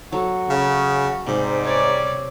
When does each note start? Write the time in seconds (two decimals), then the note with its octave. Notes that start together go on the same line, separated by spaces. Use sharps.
0.12 F#3 F#4 A4
0.48 C#3
1.26 G#2 C3 G3
1.64 C#5 D5